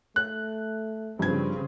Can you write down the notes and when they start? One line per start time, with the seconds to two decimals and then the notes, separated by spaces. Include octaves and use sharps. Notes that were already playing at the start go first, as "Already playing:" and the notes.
0.16 A3 F#6
1.19 G2 C#3 F3 C4 G#6